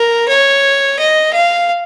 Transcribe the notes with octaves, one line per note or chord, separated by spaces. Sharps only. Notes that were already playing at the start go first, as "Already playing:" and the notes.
Already playing: A#4
C#5
D#5
F5